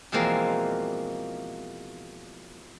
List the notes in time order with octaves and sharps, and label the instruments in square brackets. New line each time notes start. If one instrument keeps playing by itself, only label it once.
[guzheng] B2 E3 F3 G#3 A#3 C4